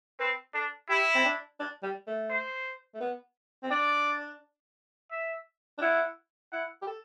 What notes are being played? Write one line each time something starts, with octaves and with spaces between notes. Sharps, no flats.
C4 B4
D4 A4
E4 G4
C4
D4
D4
G3
A3
C5
A3
B3
C4
D4 D5
E5
D4
E4 F#5
E4 F#5
G4
A4